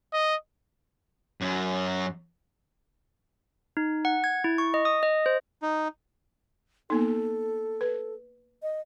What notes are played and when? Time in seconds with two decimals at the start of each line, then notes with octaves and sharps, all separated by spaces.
0.13 D#5
1.41 F#2 F#3
3.77 D#4
4.05 F#5
4.24 G#6
4.44 E4
4.58 C#6
4.74 D#5
4.85 D#6
5.03 D#5
5.26 C5
5.62 D#4
6.90 A#3 B3 D#4 A4
7.81 B4
8.63 D#5